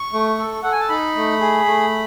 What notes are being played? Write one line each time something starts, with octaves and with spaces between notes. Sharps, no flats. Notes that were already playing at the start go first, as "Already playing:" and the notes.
Already playing: C#6
A3
A4
A4 F#5
G#5
A5
D#4 B5
A3
G#4
A3